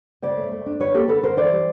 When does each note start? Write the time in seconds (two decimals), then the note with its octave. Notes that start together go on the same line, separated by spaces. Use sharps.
0.22 C#3 C5 D5
0.37 A3
0.52 A3
0.66 D4
0.80 D3 B4 C#5
0.94 A#3 G4 A4
1.08 D3 A4 B4
1.23 D3 A#4 C5
1.37 E3 C5 D5
1.51 G3